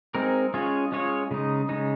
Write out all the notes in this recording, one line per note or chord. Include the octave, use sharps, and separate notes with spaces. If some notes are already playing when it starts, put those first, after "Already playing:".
G#3 C4 D#4 A#4
G#3 C#4 F4 G#4 C#5
G#3 C#4 F4 G#4 C#5
C#3 G#3 D#4
C#3 G#3 D#4